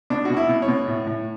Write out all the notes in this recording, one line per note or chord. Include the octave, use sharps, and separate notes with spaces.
B2 D4
B2 F#4
E4
B2
C#5
B2
A2
A2